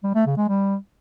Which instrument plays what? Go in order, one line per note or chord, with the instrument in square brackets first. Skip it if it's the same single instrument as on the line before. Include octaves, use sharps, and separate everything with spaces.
[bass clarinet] G3
A3
C#3
G#3
G3